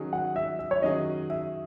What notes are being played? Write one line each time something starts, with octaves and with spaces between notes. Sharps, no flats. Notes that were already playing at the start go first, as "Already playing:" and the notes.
Already playing: D#3 F#3 C#4 G#4
F#5
E5
E5
C#5
D#3 F#3 C#4 G#4 D#5
E5